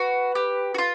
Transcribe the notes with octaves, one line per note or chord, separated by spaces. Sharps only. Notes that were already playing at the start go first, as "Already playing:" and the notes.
Already playing: F#4 B4
G4
F#4
F4